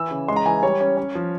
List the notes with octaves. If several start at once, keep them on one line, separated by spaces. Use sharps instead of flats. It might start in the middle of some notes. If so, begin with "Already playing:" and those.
Already playing: E3 E6
C#3
G#3 C6
A#5
E3 G#5
G3 C#5
C#4
C#4
F3